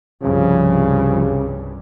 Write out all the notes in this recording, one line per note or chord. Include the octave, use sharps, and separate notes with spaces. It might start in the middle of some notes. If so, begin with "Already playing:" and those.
C2 G2 C#3 F3